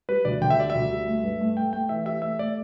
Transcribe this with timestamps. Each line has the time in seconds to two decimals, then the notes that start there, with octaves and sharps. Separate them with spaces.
0.09 G3 B4
0.25 D2 D5
0.41 D3 G5
0.50 E5
0.58 G3 D5
0.70 E5
0.75 D2
0.90 G3
1.07 A3
1.23 G2
1.41 A3
1.57 A3 G5
1.73 A3 G5
1.89 E3 E5
2.06 G4 E5
2.22 A3 E5
2.39 A3 D5